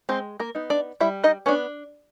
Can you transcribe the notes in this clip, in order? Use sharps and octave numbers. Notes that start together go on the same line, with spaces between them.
G#3 C4 C5
A#3 A#4
B3 D#4
D4 D5
G3 E4 E5
D#4 D#5
B3 C#4 D4 C#5